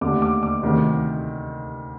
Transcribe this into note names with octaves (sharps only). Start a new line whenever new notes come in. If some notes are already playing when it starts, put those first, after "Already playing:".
D#2 D3 A3 D6
D6
D6
D2 C3 D#3